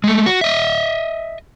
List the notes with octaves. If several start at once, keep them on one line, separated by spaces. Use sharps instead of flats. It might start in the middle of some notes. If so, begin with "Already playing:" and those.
G#3 A3
F#4
D#5 E5